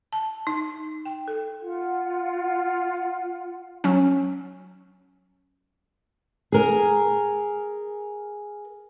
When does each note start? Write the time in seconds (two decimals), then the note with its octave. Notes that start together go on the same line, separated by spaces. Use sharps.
0.13 A5
0.47 D#4
1.05 G5
1.28 A4
1.62 F4 F#5
3.84 F#3 C#4
6.52 G#4 A#4